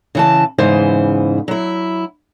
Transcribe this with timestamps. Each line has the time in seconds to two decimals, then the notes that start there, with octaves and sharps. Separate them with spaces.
0.15 C#3 E3 A5
0.58 E2 G#2 C#3 E3 C5
1.48 F#3 E4